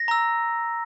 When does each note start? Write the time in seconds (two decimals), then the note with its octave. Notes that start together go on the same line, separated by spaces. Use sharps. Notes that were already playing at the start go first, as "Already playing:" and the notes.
Already playing: A#6
0.08 A#5 E6